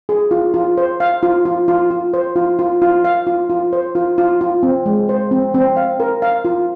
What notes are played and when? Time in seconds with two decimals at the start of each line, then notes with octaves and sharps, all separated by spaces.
0.09 G#4
0.31 F4
0.54 F4
0.78 C5
1.00 F5
1.23 F4
1.45 F4
1.68 F4
1.90 F4
2.14 C5
2.36 F4
2.59 F4
2.82 F4
3.04 F5
3.27 F4
3.50 F4
3.73 C5
3.95 F4
4.18 F4
4.41 F4
4.63 C4
4.86 G#3
5.09 C5
5.31 C4
5.54 C4
5.77 F5
6.00 A#4
6.22 F5
6.45 F4